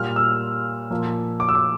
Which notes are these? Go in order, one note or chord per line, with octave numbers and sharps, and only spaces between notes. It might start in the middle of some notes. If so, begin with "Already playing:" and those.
Already playing: A#2 G3 A#3 F6
E6
A#2 F3 A#3
D6
E6
D6